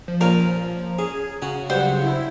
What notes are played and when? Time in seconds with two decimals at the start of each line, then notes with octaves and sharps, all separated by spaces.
0.08 F3
0.21 A#2 C#4 F4 A#4
0.99 C#4 G#4
1.42 C#3 C#4 F#4
1.70 G2 F#3 G3 C5 F#5
2.02 E4